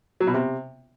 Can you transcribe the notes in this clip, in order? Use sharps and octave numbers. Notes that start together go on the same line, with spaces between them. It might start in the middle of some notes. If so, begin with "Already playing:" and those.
F#3
B2
C3